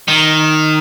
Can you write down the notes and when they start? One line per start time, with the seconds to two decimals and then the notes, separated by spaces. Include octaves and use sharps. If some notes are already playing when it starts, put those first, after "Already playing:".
0.08 D#3